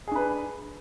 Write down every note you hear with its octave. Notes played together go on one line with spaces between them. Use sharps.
D4 G#4 B4